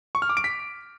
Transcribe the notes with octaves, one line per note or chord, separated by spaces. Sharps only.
C#6
F6
D6
D7
B6